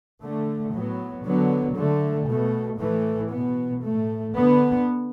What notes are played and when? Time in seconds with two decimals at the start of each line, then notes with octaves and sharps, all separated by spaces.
0.21 D3 A3
0.72 A2 F#3 B3
1.24 D3 F#3 B3
1.77 D3 A3
2.28 B2 A3
2.79 A2 E3 A3
3.31 B2 B3
3.83 A2 A3
4.35 D3 B3